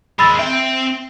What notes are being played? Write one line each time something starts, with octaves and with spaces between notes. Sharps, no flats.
D#2 G#3 B5 E6 A6
C4 E5 G5